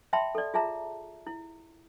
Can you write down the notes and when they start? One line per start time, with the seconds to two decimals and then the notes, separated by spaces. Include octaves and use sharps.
0.13 E5 G5 A5 B5 C6
0.35 A4 D5
0.54 F4 G#4 E5 A5 A#5
1.27 E4